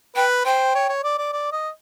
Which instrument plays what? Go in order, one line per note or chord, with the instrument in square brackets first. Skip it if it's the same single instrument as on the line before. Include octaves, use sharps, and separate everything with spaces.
[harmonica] B4 [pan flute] G5
[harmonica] C5 [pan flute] G5
[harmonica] C#5
C#5
D5
D5
D5
D#5